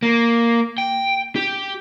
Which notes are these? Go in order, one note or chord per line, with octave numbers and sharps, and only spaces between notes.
A#3
G5
G4